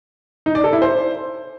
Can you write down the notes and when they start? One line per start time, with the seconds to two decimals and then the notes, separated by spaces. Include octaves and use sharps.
0.46 D#4
0.55 D5
0.64 A4
0.73 E4
0.82 C5